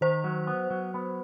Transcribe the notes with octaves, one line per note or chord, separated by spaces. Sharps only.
D#3 C5
F#3
B3
F#3
B3